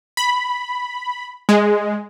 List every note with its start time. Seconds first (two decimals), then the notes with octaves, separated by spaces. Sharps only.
0.17 B5
1.49 G#3